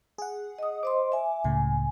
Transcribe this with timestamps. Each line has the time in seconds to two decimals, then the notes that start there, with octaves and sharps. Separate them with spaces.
0.18 G#4 F#5
0.58 D#5 D#6
0.83 C5 D#5 C6 D6
1.12 E5 G#5
1.44 C#2 A2 C#3 G#5